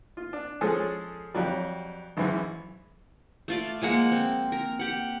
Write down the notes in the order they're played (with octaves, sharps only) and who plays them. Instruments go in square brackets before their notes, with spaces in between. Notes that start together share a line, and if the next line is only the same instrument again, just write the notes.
[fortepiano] F4
D4
F3 G#3 C#4 G#4 A4 C5
F2 F#3 G3
G#1 F#2 E3
[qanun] A3 F4 D5
F3 G#3 A#3 F#5
C4
A#4
G4 F#5